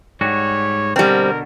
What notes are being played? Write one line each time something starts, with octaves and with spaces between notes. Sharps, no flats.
G#2 G3 F#4 C#5
B2 D3 G3 C4 A#4